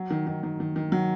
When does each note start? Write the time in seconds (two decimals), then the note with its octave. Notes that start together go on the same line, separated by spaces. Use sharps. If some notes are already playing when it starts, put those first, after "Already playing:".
Already playing: F#3
0.10 D#3
0.27 D#3
0.43 D#3
0.60 D#3
0.76 D#3
0.92 F#3